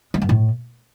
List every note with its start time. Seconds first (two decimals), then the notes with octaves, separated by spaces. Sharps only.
0.14 G#3
0.22 G2
0.29 A2